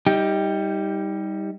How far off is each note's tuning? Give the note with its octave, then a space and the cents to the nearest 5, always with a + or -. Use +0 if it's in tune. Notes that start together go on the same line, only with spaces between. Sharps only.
G3 +0 D#4 +30 G4 +5